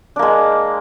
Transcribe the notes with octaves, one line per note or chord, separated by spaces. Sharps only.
G#3 A#3 D4